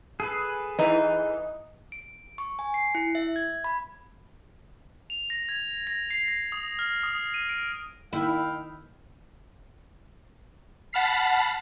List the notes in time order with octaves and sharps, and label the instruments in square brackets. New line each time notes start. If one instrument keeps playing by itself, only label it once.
[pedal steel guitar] G#4 A4 B4
[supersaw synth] E3 [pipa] D#4
[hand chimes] D7
C#6
G#5
C7
E4
E5
G#6
B5
[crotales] F7
A#6
G#6
A#6
C7
A#6
D#6
F6
D#6
D#7
D7
[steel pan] D#3 A#3 [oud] E4 [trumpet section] D#5 F5 G5
[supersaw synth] F#5 A5 B5 F6 B6 C7